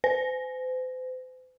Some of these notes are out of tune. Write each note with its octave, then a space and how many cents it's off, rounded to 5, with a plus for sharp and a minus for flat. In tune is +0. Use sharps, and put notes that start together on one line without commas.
C5 -40